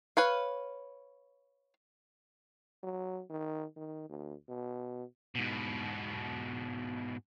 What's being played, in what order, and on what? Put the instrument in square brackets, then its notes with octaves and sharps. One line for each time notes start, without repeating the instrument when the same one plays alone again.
[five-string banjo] B4 C#5 F5
[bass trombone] F#3
D#3
D#3
D2
B2
[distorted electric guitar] G#2 B2